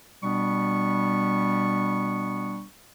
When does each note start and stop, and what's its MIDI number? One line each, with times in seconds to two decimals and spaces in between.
0.24 2.64 47
0.24 2.64 55
0.24 2.64 59
0.24 2.64 62
0.24 2.64 85